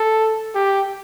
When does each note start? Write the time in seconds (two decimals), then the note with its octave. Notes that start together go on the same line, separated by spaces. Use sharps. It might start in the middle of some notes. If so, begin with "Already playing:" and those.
Already playing: A4
0.55 G4